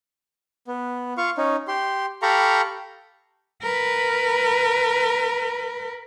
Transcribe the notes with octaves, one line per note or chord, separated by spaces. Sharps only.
B3
F4 F5 C#6
C#4 D#4
G4 C6
G4 A4 F5 A#5 B5 C#6
A#4 B4